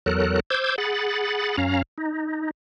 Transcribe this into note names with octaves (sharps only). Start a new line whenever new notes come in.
E2 F#3 A4 A#4 F#6
C5 D6 E6 G6 G#6
G#4 F#5 B5 A6
F#2 C#4 F5 A#5
D#4